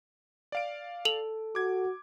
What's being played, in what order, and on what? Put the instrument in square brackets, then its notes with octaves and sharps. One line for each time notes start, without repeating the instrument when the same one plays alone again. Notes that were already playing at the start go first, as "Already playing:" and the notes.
[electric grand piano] D5 F5 D7
[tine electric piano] A4 [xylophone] F7 F#7
[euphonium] F#4 [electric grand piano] D6 G#6